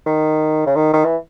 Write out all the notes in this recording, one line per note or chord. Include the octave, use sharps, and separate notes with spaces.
D#3
C#3
D#3
D#3
E3